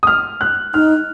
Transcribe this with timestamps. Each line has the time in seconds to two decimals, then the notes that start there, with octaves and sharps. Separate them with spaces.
0.03 D#6
0.07 F6
0.41 F#6
0.74 D#4 F6